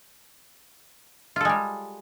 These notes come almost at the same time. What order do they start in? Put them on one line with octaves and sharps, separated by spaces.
F4 A4 G#3 G3